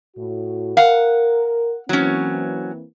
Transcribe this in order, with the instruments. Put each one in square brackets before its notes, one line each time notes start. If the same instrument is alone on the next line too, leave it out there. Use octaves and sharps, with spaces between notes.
[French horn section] A2 F#4
[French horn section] A#4 [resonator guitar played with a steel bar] F5 F#5
[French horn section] E3 A#3 C4 [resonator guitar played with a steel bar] F#3 C#4